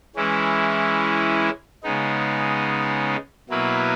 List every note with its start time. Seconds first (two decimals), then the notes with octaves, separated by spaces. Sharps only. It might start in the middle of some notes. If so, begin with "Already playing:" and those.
0.16 E3 G#3 C#4 E4
1.83 C#3 G#3 B3 D#4
3.50 B2 F#3 A#3 E4 B4